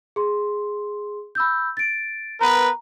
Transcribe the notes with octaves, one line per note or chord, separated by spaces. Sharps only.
G#4 C6
B5 E6 G6
A6 D7
B3 A#4 B4 A#5